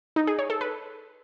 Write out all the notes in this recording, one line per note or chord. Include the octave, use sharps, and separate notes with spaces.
D#4
G#4
C#5
A4
B4